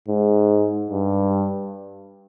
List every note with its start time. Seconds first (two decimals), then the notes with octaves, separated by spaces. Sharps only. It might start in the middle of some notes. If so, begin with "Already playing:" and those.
0.09 G#2
0.91 G2